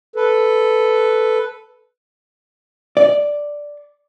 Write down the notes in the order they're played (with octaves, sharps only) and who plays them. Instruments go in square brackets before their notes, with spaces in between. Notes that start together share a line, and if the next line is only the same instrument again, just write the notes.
[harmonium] A4 B4
[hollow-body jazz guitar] D5